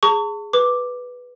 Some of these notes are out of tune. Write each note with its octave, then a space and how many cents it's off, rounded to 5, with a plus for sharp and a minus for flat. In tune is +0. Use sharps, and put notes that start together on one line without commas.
G#4 +0 A5 +40 C#6 +25
B4 +0 D6 +0